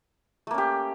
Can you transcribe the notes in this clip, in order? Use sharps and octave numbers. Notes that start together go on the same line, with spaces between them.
A3 A#3 C#4 G4